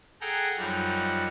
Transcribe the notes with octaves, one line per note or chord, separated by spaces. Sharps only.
G#4 A4 F#5 G5 A#5
F#2 F3 G3 D#4 F#4